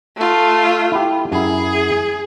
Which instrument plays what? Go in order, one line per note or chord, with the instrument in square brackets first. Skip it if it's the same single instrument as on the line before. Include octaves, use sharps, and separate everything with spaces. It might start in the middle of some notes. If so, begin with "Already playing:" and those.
[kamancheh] A3 F4
[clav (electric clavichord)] E4 G4
[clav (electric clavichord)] F#2 E4 [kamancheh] G#4